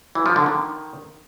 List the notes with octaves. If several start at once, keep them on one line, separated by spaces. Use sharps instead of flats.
E3
F3
D3
D#3